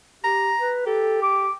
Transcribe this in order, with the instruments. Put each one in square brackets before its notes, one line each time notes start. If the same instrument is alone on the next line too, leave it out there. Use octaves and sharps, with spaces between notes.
[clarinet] G4 [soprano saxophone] A#5
[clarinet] B4
[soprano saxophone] G4 [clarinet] A4
[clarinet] D6